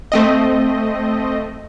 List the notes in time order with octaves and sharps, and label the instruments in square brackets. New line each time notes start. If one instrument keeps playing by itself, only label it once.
[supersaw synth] A3 C4 D#5